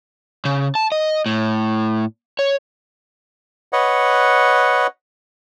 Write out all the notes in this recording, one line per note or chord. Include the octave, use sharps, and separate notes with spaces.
C#3
A5
D#5
A2
C#5
B4 C#5 D#5 F#5